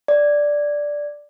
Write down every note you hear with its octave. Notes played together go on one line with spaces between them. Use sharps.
D5